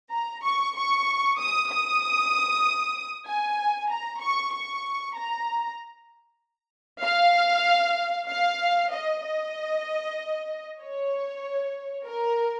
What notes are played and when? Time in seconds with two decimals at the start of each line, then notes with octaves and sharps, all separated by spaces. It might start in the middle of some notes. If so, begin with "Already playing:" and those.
0.12 A#5
0.44 C#6
0.75 C#6
1.39 D#6
1.69 D#6
3.27 G#5
3.90 A#5
4.21 C#6
4.53 C#6
5.16 A#5
7.04 F5
8.30 F5
8.93 D#5
9.25 D#5
10.82 C#5
12.08 A#4